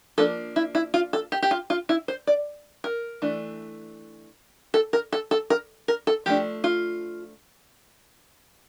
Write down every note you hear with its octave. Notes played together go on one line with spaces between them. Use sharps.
F3 A#3 D4 A4
E4
E4
F4
A4
G4
G4
F4
F4
E4
C5
D5
A#4
E3 A3 D4
A4
A#4
A4
A4
A#4
A#4
A4
F3 A3 D4 G4
F4